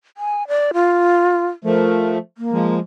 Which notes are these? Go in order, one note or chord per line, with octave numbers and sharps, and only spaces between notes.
G#5
D5
F4
F3 A3 A#4
A#3
F3 G#3